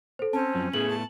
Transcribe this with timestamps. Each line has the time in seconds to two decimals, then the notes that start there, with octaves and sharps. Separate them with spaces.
0.19 A4 C5
0.33 C4 C#4 A5
0.55 F#2 F3
0.73 A2 A3 B3 G#4 F#7
0.89 A5